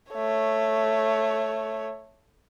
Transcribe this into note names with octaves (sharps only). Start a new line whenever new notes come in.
A3 C#5